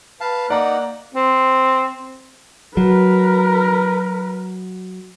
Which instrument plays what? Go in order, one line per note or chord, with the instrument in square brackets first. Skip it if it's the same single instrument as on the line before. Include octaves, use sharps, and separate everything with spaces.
[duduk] B4 [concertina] F5 A5
[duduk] A#3 [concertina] D#4 F#5 [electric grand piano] D5 A#5 D6
[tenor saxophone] C4
[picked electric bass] F#3 [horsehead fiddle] A#4 B4